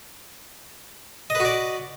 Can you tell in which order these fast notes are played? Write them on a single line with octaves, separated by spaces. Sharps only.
D#5 B4 F#4 D5